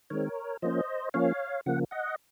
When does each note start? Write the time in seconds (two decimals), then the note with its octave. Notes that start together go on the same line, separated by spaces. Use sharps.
0.10 D#3 G#3 C4 A#4 C#5
0.62 F3 A#3 C#4 C5 D#5
1.14 F3 A#3 C#4 C#5 F5
1.66 C#3 F3 A#3 F#5
1.91 D#5 F#5